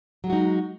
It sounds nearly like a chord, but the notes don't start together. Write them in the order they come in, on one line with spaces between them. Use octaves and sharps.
F#3 G#3 F#4 D#4